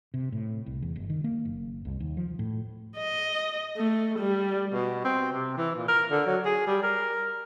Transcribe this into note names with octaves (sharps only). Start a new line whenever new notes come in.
C3
A2
C2
E2
G1
D#3
A#3
F#1
C2
D#2
F3
A2
D#5
A3
G3
B2
C4
C3
E3
A#2
A#4
D3
F#3
G#4
G3
A#4